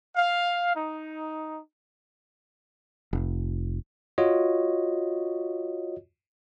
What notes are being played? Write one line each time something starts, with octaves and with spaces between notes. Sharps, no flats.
F5
D#4
F1
F4 F#4 C#5 D#5